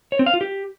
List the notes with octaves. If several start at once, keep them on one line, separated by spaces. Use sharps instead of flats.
C#5
C4
F5
F4
G4